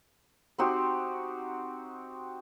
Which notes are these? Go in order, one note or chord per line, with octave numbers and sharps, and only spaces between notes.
C4 D#4 F#4 G4